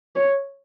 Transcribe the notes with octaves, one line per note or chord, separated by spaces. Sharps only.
C#5